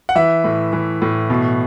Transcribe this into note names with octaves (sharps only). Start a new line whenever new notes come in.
F#5
E3 E5
A2
E3
A2
B2